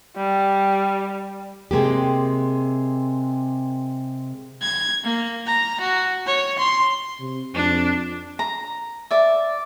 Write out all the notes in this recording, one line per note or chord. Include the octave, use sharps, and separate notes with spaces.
G3
C3 G#3 A#3 G4
G#6
A#3
A#5
F#4
C#5
C6
C3
F2 D4
A#5
D5 E5